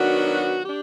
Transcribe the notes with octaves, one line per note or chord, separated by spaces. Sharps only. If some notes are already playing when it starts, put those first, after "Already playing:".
Already playing: D#3 F#3 B3 D4 F#4
D4 G4